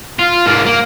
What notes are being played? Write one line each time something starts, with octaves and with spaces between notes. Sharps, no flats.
F4
G#2 A#3
A#3